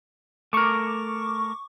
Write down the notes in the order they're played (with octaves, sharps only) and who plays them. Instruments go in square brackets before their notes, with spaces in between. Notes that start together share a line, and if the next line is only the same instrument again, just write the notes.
[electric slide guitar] A3 A#4 [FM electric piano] C#6 D6